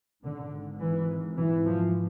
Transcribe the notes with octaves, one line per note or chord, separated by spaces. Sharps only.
G#1 G#2 D3
E3
E3
F3